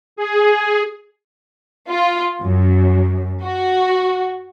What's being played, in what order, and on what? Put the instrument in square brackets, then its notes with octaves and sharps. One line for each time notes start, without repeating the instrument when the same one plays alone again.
[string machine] G#4
[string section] F4
F#2
F#4